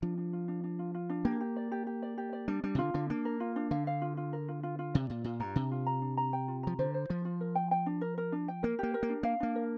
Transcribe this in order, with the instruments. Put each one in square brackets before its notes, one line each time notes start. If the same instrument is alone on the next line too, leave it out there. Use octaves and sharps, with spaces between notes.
[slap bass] F3 [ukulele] D4
[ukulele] D4
F4
D4
D4
F4
F4
D4
[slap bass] A#3 [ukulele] G4
[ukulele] G4
D5
G4
G4
D5
G4
D5
[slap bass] G3 [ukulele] D4
[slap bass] G3 [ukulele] D4
[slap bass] C3
[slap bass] D3 [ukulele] F4
[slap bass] D3 [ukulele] D4
[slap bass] A#3 [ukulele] D4
[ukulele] A#4
F4
D4
[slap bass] D3 [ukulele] F5
[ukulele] F5
F4
F4
A#4
F4
F4
F4
[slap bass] C3 [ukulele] D5
[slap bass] A#2 [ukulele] F4
[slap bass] A#2 [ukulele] F4
[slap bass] G2 [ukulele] A#5
[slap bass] C3 [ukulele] D4
[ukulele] F4
A#5
D4
A#5
G5
F4
[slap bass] F3 [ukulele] A#5
[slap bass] D3 [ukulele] C5
[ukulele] C5
[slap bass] F3 [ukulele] F4
[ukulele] F4
A#4
G5
G5
D4
A#4
A#4
D4
G5
[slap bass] A#3 [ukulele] A#4
[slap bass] A#3 [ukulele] G4
[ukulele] A#4
[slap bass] A#3
[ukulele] D4
[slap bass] A#3 [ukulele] F5
[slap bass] A#3 [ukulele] D4
[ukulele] A#4